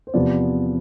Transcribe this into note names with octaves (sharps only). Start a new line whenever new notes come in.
C5
E2 C3 F3 B3 D5